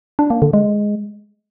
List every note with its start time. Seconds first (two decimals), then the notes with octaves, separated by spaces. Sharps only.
0.19 D4
0.30 A#3
0.42 D3
0.53 G#3